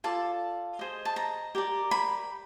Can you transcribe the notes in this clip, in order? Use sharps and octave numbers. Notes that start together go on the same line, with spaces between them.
F4 A4 D5 A5
G#4 C5 D#5
A5
A#5
G4 A#4 D5
B5